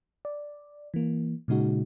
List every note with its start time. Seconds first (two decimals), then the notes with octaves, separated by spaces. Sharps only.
0.25 D5
0.94 E3 A#3
1.48 A#2 C#3 G#3 D#4 F#4